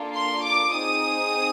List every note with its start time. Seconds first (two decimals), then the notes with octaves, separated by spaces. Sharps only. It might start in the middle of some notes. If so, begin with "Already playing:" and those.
Already playing: A#3 D4 F4 A4
0.13 C6
0.44 D6
0.73 C4 D#4 G#4 D#6